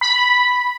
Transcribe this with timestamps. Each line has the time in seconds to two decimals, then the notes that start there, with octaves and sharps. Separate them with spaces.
0.01 B5